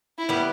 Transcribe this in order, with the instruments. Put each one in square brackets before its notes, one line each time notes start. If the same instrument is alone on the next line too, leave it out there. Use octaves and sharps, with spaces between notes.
[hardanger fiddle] E4
[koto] G3 B3